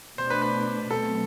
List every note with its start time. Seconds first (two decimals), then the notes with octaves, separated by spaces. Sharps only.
0.18 B2 A3 D4 C5
0.30 B4
0.42 B4
0.90 B2 F#3 A3 C4 A4